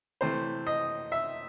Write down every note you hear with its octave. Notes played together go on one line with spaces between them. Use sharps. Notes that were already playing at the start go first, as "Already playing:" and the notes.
C3 E3 A3 C5
D#5
E5